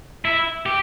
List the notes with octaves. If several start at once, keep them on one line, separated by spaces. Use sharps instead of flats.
E4
G4